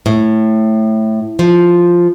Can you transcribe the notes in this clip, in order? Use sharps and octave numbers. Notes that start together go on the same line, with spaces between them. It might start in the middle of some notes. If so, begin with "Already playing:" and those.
A2
F3